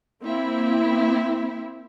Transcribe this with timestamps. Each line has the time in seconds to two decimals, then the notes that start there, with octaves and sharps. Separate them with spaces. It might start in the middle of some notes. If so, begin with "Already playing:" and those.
0.22 A#3 C4 E4